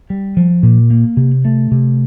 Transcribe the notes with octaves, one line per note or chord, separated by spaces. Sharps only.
G3
F3
A#2
A#3
C3
A3
C3